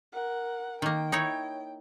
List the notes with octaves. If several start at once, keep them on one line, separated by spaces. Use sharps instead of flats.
A#4 F#5
D#3 A#3 G5
D#4 E4 C#5